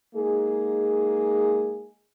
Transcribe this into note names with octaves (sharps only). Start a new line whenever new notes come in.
G#3 A#3 D#4 G#4